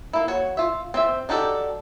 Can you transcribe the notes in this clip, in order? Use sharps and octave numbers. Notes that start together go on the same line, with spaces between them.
A#3 E4
F#4 C#5
F4 E5
C4 C5 E5
D4 D#4 F#4 G4 A4